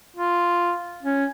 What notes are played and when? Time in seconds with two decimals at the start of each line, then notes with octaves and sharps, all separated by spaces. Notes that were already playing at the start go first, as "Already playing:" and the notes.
0.17 F4
1.03 C#4